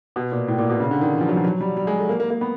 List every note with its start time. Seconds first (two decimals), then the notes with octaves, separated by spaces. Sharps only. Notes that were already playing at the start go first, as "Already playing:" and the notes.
0.16 B2
0.32 A#2
0.48 A2
0.58 A#2
0.70 B2
0.80 C#3
0.91 D3
1.01 D#3
1.12 E3
1.20 F3
1.29 F#3
1.36 F3
1.45 F#3
1.61 G3
1.77 G3
1.87 G#3
1.99 A3
2.09 A#3
2.20 A#3
2.30 A#3
2.41 B3